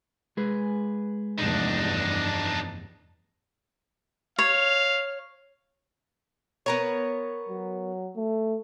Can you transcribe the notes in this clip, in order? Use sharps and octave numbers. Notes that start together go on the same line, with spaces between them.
G#3 G#4 B4
F1 E2 G2 D4 D#4
C#5 F5
B3 A#4 C#5
F#3
A3